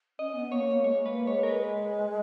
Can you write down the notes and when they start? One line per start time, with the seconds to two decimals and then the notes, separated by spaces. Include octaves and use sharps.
0.19 C#4 D#5
0.35 B3
0.52 A#3 C#5
0.68 A#3
0.84 G#3 C#5
1.05 A#3 B4
1.27 G#3 C#5
1.43 A#4
1.49 B4